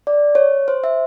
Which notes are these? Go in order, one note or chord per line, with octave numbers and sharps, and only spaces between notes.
D5
C#5
C5
E5